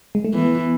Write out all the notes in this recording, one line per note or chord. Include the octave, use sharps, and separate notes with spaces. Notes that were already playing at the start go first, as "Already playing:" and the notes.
G#3
A3
E3 B3